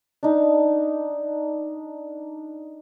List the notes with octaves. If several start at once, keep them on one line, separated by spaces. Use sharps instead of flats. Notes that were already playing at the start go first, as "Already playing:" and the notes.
D4 D#4